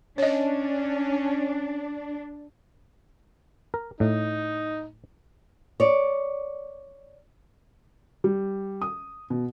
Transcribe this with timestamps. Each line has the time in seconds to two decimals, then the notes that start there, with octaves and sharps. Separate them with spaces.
0.18 C#4 D4 C#5 D#5
3.74 A#4
4.00 A2 D#4
5.80 C#5 D5
8.24 G3
8.82 D#6
9.30 B2